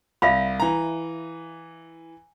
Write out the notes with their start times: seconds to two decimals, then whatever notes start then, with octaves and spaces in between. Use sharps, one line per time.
0.22 C2 E5 F5 B5
0.60 E3 A#5